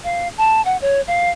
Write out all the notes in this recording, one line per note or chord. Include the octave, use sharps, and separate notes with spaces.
F5
A5
F#5
C#5
F5